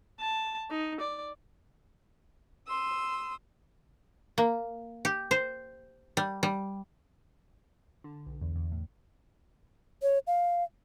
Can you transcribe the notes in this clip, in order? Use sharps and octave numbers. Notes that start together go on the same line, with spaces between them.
A5
D#4
D5
C6 D#6 E6
A#3
G4
C5
G3
G3
D3
B1
E2
E2
A2
C#5
F5